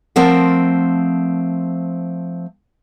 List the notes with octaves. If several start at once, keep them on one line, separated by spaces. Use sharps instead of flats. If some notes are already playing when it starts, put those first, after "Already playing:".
F3 A3 C4 A#4 F#5